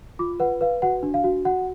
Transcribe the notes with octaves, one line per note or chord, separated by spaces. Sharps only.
F4 D6
B4 F#5
B4 F5
F#4 F#5
D4
F5
F#4
F#4 F#5